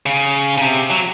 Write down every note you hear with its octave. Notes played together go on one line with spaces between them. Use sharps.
C#3
C#3
C3
F#3